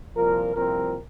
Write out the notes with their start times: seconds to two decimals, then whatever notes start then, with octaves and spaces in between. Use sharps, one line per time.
0.15 C2 A#2 F3 A#4
0.55 C2 A#2 F3 C4 A#4